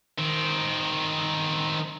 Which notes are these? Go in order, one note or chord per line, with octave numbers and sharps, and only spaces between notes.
D#3 C4